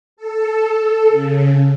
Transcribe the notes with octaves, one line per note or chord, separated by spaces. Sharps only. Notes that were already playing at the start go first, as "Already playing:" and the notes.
A4
A4
C#3